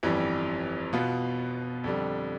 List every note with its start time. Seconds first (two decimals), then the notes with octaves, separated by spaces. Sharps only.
0.03 G1 F2 E3 G3
0.93 B2 B3 F4
1.84 F2 D3 G3